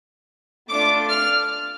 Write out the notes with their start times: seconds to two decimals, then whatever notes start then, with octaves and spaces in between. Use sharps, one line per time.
0.69 A3 D4 F4 D6
1.09 F6